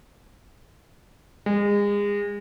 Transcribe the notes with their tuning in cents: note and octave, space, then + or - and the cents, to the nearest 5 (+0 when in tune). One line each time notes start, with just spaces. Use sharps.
G#3 -30